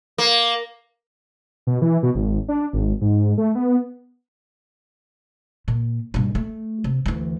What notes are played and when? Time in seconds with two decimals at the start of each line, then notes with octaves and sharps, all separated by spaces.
0.18 A#3
1.67 B2
1.82 E3
2.03 B2
2.15 G#1
2.48 D4
2.73 G#1
3.01 G#2
3.38 A3
3.55 B3
5.68 A#2
6.14 G2 B2
6.35 A3
6.84 C3
7.06 D2 E3